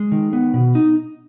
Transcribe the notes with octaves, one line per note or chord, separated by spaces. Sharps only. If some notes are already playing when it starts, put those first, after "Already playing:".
Already playing: G#3
D#3
B3
B2
D#4